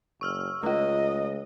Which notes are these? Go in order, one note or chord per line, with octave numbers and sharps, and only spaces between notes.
F#1 C#6 E6 F6
C#2 A3 F4 D#5